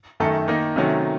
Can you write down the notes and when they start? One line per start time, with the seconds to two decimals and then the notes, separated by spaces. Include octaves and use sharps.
0.20 F#2 D#3 A3 D#4 A4
0.48 D#3 A#3 D#4
0.76 C3 D#3 F#3 A3 C#4